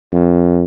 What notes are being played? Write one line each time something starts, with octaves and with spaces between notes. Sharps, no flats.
F2